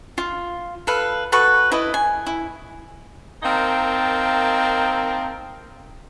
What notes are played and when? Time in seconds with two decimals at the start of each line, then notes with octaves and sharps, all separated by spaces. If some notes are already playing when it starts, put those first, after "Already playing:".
0.18 F4
0.87 A4 B4 F5
1.32 F#4 A4 B4 C#6
1.72 E4 B4 D#5 A5
1.94 G#5
2.26 E4
3.43 A#3 C4 D#4 A#4 G5 A5